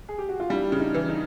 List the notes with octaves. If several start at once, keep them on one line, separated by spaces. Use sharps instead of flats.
G#4
G4
F#4
F4
G3 D4 E4
C#3
D#4
E3
D#4